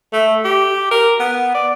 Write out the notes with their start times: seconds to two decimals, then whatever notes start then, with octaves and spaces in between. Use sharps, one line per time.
0.13 A3
0.44 G4
0.91 A#4
1.19 B3
1.54 D5